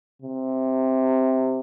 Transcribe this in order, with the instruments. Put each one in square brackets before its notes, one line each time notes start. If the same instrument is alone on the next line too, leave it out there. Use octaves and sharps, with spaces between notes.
[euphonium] C3